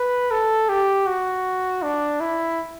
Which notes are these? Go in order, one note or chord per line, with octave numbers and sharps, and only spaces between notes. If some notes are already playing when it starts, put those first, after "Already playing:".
Already playing: B4
A4
G4
F#4
D4
E4